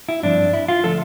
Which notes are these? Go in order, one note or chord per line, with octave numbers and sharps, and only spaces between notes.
E4
G2 F3 C4 D4
E4
F4
D3 F3 A3 A4